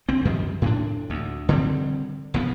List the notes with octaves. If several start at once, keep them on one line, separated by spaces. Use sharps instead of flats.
C2 C4
F#2 D#3 F3 G3
A2 C4 D4
D2
D3 G3 C4
C2 F3 B3